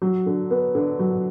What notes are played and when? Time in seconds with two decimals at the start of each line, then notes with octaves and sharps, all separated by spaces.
0.02 F#3
0.26 D3
0.51 B3
0.75 D3
0.99 F#3